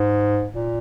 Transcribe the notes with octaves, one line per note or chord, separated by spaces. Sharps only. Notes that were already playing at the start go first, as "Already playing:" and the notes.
Already playing: G#2
A#2